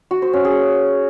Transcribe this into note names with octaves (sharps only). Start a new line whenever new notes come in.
F#4
C5
C#4
G#4